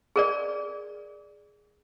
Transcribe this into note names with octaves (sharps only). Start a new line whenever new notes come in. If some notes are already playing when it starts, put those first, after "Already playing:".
G#4 A#4 D5